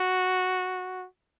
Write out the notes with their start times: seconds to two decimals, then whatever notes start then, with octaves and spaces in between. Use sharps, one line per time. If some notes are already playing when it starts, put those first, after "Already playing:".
Already playing: F#4